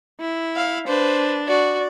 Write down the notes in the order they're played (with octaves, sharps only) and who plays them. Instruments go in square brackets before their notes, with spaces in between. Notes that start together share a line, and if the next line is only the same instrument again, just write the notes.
[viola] E4
[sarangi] F5
[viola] D4 [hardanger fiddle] B4 [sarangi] C5
[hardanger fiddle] F#4 [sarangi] D5